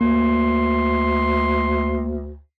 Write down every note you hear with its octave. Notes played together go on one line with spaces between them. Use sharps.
D2 A#3 C6